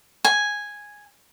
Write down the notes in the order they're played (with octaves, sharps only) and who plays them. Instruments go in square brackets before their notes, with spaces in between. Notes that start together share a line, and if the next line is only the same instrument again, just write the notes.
[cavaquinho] G#5